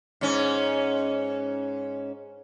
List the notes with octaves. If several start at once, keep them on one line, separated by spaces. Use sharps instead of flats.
G#2 C#4